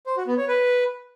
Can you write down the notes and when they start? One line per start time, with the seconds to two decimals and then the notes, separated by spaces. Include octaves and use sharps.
0.07 C5
0.17 F#4
0.27 B3
0.38 C#5
0.48 B4